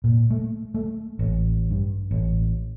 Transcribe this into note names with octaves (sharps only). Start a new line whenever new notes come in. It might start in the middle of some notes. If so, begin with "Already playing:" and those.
A#2
A3
A3
A1
G2
A1